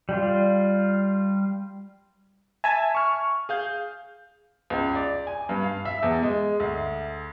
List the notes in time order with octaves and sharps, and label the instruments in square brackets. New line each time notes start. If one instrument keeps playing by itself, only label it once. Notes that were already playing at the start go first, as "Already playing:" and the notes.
[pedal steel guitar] G3 F4
[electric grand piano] E5 [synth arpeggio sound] G#5 A5
[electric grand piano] C#6 F6
G#4 F5 G6
[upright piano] C#2
D5
G#5
G2
F5
E5
E2
G#3
D2